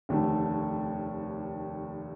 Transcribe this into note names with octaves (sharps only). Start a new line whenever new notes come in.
F1 D#2 D3 A3